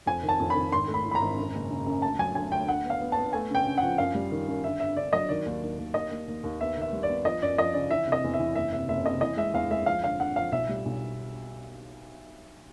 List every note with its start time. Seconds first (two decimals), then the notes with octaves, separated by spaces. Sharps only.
0.06 F2 G#5
0.23 D#3
0.29 A5
0.40 F2
0.50 B5
0.55 D#3
0.72 G#1 C6
0.88 A3
0.94 B5
1.05 E3
1.11 B5
1.15 A#5
1.22 G#1
1.38 F#2
1.54 F#1
1.70 C#3
1.86 F#2
2.02 D2 A5
2.19 F#3 G#5
2.35 D2 G#5
2.51 D2 G5
2.68 D2 F#5
2.85 B3 F5
3.01 B3
3.12 A5
3.17 B3
3.33 A3 G#5
3.50 C#3 G5
3.67 C#3
3.78 F#5
3.83 F3
3.98 F#2 F5
4.15 G3
4.31 D#3
4.47 F#2
4.64 D3 E5
4.80 G2 E5
4.96 D3 D5
5.13 F#3 D#5
5.29 D#3 D5
5.46 D#2
5.62 D#2
5.78 D#2
5.94 D#2 D#5
6.11 D#2
6.28 D#2
6.43 D#2
6.61 B3 E5
6.77 D#3 E5
6.93 G3
7.03 D5
7.09 B3
7.25 F3 D#5
7.42 F#2 D5
7.58 F3 D#5
7.74 C#3 D5
7.90 E3 E5
8.06 C3
8.12 D#5
8.24 E2
8.34 E5
8.39 E3
8.55 F#1 E5
8.72 C3 E5
8.88 F#1 E5
9.05 C3 D#5
9.21 E3 D#5
9.37 G#3 E5
9.53 E2 F5
9.70 G#3 E5
9.86 F3 F5
10.03 D3 F5
10.19 D3 F#5
10.36 F3 F5
10.52 B1 E5
10.69 G3
10.85 B1